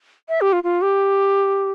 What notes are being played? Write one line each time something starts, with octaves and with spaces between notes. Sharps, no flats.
E5
G4
F4
F4
G4